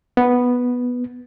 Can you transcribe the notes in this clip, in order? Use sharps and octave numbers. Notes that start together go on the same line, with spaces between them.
B3